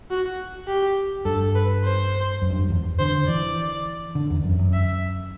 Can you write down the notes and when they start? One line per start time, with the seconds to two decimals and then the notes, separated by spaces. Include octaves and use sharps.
0.11 F#4
0.67 G4
1.25 G2 A4
1.55 B4
1.84 C5
2.42 F#2
2.50 G2
2.60 F#2
2.70 E2
2.99 D3 C5
3.28 E3 D5
4.15 D3
4.30 E2
4.45 F#2
4.59 F#2
4.73 E5